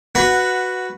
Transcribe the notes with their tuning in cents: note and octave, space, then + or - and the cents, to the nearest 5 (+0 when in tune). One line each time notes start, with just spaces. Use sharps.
F#4 +0 B4 +0 F#5 -10